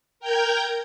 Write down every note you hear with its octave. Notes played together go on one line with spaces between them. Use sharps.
A#4 G5 A#5 G6 G#6 A#6